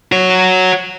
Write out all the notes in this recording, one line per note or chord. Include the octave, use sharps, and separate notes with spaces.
F#4 C#5